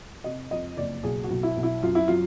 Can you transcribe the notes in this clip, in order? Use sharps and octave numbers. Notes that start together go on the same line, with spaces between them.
C3 D#5
F2 D#5
F#1 D5
B1 G#4
F#4
B1
E4
B1
E4
F#2 F4
E4
F#3 F4